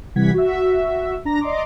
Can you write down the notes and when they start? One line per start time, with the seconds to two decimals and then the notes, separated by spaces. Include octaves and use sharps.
0.16 C3 E3 G3 F#5 G#6 B6
0.34 F#4 E5
1.25 D4 A#5 A#6
1.41 D5 D#5 A#5 C6 D6